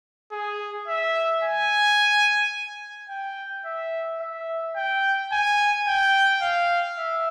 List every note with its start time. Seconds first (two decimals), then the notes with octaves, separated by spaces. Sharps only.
0.32 G#4
0.88 E5
1.43 G#5
3.09 G5
3.65 E5
4.20 E5
4.76 G5
5.32 G#5
5.87 G5
6.42 F5
6.98 E5